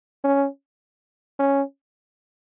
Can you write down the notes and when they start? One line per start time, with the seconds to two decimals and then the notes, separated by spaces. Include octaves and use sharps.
0.24 C#4
1.39 C#4